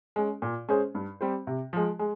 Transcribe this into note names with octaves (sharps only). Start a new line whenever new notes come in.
G#3 C#4
A#2
G#3 C#4 G#4 C5
G2
G3 C4 G4 C5
C3
F3 G#3
G#3